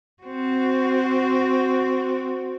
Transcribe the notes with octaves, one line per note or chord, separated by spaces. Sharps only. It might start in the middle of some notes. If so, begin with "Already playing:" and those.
C4 F#4